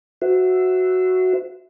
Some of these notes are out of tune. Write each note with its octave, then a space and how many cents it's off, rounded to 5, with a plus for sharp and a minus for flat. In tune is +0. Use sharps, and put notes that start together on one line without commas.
F#4 +0 C5 -35 E5 +0